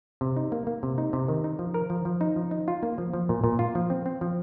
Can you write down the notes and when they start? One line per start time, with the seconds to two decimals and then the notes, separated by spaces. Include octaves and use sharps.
0.21 C3
0.37 D#4
0.52 A#3
0.67 A#3
0.83 C3
0.98 D#4
1.13 C3
1.28 D#3
1.44 D#4
1.59 F3
1.74 A#4
1.90 F3
2.05 F3
2.21 D#4
2.36 F3
2.51 D#4
2.68 F4
2.83 A#3
2.98 F3
3.13 F3
3.29 A#2
3.44 A#2
3.59 F4
3.75 F3
3.90 C4
4.06 C4
4.21 F3